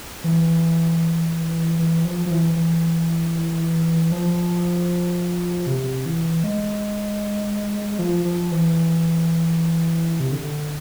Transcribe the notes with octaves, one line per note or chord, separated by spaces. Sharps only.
E3
E3
F3
F3
E3
E3
F3
C3
E3
G#3
F3
F3
E3
C3
D3